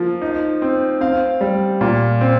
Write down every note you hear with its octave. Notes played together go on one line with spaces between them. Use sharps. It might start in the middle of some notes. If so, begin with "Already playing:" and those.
Already playing: F3 A#3
D#4
C4
C4 F5
G3
A#2
C4